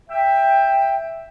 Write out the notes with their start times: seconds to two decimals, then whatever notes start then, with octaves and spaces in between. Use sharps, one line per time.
0.10 E5 G5